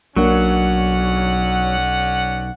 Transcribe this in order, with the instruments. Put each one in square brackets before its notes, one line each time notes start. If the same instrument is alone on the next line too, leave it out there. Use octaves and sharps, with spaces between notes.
[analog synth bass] B1 [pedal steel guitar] F#3 [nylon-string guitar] A#3 D4 [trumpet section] C#4 D5 F#5